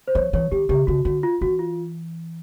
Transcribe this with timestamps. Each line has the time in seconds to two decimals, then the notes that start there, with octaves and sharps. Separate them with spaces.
0.08 C5
0.15 F3 C#5
0.33 E3 C#5
0.52 D#3 G4
0.69 C#3 G4
0.87 C#3 F#4
1.05 D3 F#4
1.23 F4
1.41 E3 F#4
1.59 F4